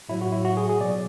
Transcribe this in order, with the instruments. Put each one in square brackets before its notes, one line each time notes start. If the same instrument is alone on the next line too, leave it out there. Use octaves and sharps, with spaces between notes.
[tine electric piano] A2 F#3 E4
F#4
E4
F#4
G#4
G#4
B2 F#3 D5